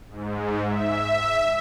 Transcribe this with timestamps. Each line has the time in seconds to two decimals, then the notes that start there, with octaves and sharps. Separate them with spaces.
0.10 G#2
0.65 E5